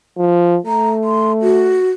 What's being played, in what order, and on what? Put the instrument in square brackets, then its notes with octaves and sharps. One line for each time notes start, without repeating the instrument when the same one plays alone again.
[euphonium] F3
[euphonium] A3 [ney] A#5
[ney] C6
F#4